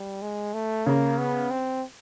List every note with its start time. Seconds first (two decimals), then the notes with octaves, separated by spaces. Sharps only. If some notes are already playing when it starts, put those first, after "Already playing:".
Already playing: G3
0.22 G#3
0.54 A3
0.86 C#3 A#3
1.18 B3
1.51 C4